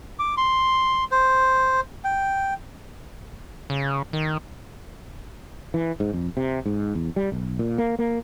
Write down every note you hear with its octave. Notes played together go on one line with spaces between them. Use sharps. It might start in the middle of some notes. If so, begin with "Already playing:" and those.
D6
C6
C5
G5
C#3
D#3
E3
G#2
F2
C3
G#2
E2
G3
B1
A#2
A#3
A#3